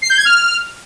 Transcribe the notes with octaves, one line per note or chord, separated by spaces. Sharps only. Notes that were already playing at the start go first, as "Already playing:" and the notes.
C7
G6
G#6
F6